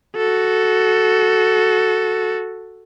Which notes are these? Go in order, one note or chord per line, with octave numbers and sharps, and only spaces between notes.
F#4 A4